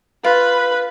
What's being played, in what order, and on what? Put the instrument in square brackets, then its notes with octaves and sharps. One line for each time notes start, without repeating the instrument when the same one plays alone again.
[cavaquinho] F4 [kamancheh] B4